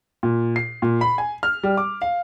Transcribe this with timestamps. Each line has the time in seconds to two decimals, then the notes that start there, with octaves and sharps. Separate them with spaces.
0.23 A#2
0.56 C7
0.82 A#2
1.01 B5
1.18 G#5
1.43 F6
1.63 G3
1.77 D6
2.02 F5